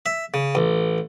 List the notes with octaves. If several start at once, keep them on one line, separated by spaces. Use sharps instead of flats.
E5
C#3
A1